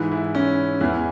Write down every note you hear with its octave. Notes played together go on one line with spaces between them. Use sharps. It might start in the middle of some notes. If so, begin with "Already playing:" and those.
Already playing: G#2 E3
E4
C#4
E2 E3 E4